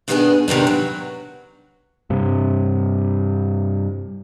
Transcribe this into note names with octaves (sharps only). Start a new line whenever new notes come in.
B2 D#3 B3 D4 F#4 G#4
C3 D#3 B3 D4
F#3
G2 C3